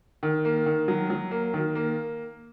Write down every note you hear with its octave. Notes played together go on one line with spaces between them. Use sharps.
D#3
A#3
D#3
F#3
F#3
A#3
D#3
A#3